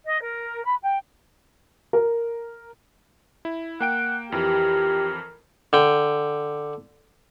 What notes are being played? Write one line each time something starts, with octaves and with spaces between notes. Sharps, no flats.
D#5
A#4
B5
G5
A#4
E4
A#3 F#5 G5 D7
F2 E3 G4 A#4
D3 G5